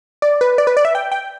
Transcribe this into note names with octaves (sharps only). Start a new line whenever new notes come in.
D5
B4
D5
B4
D5
E5
G5
G5